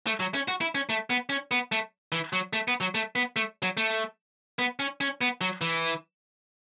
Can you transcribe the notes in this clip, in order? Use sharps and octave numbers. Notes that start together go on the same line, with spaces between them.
A3
F#3
C#4
F#4
E4
C#4
A3
B3
C#4
B3
A3
E3
F#3
A3
B3
F#3
A3
B3
A3
F#3
A3
B3
C#4
C#4
B3
F#3
E3